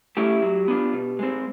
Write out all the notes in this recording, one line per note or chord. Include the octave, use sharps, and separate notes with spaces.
A3 C#4 E4 G4
F#3
B3 D4 F4
B2
G#3 C4